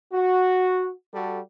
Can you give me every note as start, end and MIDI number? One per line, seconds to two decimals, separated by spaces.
0.13 0.90 66
1.14 1.39 55
1.14 1.39 66
1.14 1.39 69